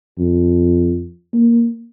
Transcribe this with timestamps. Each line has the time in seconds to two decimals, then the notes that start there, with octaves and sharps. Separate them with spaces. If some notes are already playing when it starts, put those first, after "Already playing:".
0.19 F2
1.34 A#3